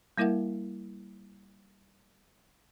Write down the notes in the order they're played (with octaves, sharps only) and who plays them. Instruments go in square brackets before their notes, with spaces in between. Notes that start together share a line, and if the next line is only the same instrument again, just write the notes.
[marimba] G3 A#3 E4 A#4 E5 F#5